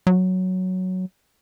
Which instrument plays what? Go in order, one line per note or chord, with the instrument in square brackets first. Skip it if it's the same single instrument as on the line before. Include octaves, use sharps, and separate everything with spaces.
[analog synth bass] F#3